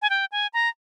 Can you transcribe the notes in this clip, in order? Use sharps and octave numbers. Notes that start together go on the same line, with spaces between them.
G#5
G5
G#5
A#5